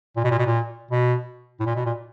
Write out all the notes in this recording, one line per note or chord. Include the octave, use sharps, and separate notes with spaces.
A#2
B2
A#2
B2
A#2
B2
A2
A#2
B2
A#2